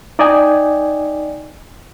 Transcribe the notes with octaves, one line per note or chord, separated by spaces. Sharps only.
D#4 D5 D#5 G5 G#5